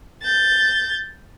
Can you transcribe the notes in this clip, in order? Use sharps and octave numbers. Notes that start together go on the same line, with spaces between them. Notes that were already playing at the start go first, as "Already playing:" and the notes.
G6 A6